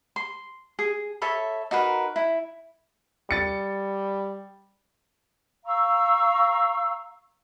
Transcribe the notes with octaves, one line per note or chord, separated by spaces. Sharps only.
C6
G#4
A4 C#5 E5 B5
D#4 F#4 A#4 B4
E4
G3 A6 C#7
F5 A#5 C#6 E6